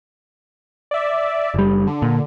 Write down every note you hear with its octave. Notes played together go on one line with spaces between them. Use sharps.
D5 E5
F#1 G3
D3
A#2